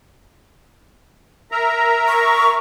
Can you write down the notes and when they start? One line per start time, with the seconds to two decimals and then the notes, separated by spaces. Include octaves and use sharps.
1.52 A#4 E5 A#5
2.08 C#6